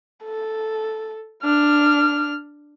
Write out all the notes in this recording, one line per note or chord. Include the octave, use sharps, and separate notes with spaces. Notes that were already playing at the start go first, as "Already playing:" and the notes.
A4
D4 F6